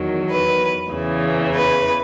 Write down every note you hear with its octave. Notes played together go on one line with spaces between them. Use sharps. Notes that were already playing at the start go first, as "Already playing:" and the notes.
Already playing: E2 D#3 F#3
B4
E2 C#3 E3
B4